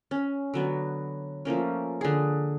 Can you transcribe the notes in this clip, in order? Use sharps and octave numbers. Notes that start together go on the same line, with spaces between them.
C#4
D3 F#3 B3
F3 A3 A#3 C#4
D3 G#4